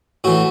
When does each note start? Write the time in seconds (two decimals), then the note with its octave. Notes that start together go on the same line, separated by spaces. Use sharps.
0.24 A2 E3 F#4